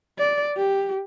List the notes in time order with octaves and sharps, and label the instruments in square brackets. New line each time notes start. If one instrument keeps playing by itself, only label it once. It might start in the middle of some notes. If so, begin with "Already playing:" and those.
[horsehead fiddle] D5
G4